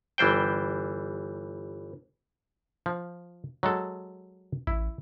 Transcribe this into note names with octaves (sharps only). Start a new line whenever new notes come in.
G1 E3 G3 C5 G5
F3
F#3 G#3 A4
A1 E4